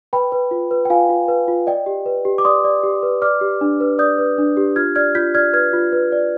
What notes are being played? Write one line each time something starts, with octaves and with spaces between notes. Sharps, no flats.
B4 G5 B5
B4
F4
B4
G5
F4 F5 G#5
F4
B4
F4
D5 D#5 G5
G4
B4
G4
D6
D5 C6 D#6
D5
G4
B4
D5 D6 F6
G4
D4
B4
D5 D#6 G6
B4
D4
G4
F4 F6 G#6
D5 F6 G#6
F4 G6 B6
D5 F6 G#6
B4 F6 G#6
F4
B4
D5